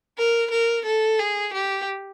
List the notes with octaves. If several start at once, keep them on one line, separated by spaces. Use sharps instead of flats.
A#4
A#4
A4
G#4
G4